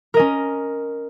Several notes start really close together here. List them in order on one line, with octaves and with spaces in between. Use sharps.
A#4 D#5 C#4